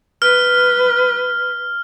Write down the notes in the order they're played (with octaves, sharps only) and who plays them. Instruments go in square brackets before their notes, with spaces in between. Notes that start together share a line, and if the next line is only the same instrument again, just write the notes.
[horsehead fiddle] B4 [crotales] F6